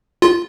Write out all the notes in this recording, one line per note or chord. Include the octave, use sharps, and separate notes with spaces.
F4